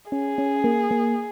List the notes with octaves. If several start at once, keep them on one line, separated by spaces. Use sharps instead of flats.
C#4 G#4
C#4
A#3
A#3